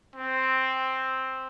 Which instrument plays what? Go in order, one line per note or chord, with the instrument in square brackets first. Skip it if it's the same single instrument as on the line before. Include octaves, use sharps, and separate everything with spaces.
[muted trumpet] C4